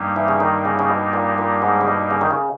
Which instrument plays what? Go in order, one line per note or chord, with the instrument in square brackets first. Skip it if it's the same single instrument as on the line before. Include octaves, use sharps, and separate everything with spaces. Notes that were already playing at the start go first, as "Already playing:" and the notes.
Already playing: [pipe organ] G2 G3 A#3 D#4
[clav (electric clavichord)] E3
C#3
D#3
C#3
C#3
B2
A#2
A#2
G#2
C#3
B2
C#3
D#3
C#3